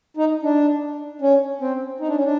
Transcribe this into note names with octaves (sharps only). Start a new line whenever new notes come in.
D#4
D4
C#4
C4
D#4
D4
C#4
D4